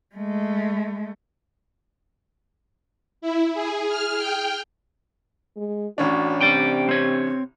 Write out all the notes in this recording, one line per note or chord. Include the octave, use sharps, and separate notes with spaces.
G#3 A3
E4
G#4
F6
G5
G#3
A1 C#4 D4 F#4
C3 D5 G5
C4 C#5